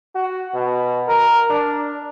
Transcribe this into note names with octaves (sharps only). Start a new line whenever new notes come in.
F#4
B2
A#4
D4